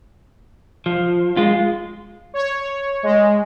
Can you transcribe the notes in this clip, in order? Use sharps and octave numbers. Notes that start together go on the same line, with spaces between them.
F3
G#3 F4
C#5
G#3